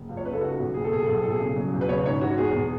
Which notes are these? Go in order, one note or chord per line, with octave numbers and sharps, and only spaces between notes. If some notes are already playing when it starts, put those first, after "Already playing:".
Already playing: F#1
C#2
C#5
C#3 B4
A4
D#4 F#4
B1
F#1 G#4
A4
B2 G#4
A4
B1 G#4
A2 A4
G#4
C#3
F#3
E1
B4
C#3 C#5
G#2 C#5
E3 F#4
E2 G#4
B2